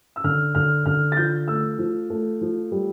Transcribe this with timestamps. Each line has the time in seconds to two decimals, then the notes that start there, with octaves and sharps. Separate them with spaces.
0.16 E6
0.24 D3 F6
0.55 D3 F6
0.86 D3 F6
1.12 A6
1.17 F3 G6
1.48 A3 E6
1.79 F3
2.10 A3
2.41 F3
2.72 G3